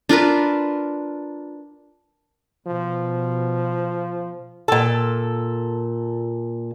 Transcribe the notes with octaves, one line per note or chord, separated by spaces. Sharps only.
D4 F4 A#4 B4
B2 F3
A#2 A4